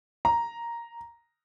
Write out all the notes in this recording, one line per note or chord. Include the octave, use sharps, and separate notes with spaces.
A#5